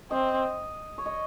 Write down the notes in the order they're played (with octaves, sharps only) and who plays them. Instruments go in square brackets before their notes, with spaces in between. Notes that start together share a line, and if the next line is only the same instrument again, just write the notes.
[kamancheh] C4 [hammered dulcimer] D#5
[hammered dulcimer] C#5
D#5